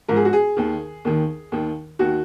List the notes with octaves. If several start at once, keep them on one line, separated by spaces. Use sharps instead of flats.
G#2 F3 A#4
G#4
F#4
G#4
D#2 D#3
D#2 D#3
D#2 D#3
D#2 D#3 F#4